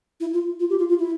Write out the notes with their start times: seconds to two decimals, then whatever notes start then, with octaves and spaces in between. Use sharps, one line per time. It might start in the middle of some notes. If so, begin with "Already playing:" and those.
0.20 E4
0.34 F4
0.60 F4
0.70 G4
0.79 F4
0.89 F4
0.99 E4